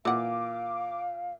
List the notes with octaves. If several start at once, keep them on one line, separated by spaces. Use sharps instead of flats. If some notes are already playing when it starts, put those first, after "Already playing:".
A#2 E3 F5 F#5 D6